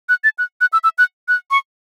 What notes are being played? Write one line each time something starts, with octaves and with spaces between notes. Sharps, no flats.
F#6
A6
F#6
F#6
E6
E6
F#6
F#6
C#6